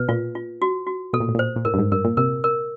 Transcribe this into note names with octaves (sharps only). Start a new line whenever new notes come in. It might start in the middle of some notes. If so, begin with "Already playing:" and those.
Already playing: B2 B4
A#2 F4
F4
F#4
F#4
B2 A4
A#2
A2
A#2 C5
A#2
A2 A#4
G2
G#2
G2 A#4
A#2
C3 A#4
A#4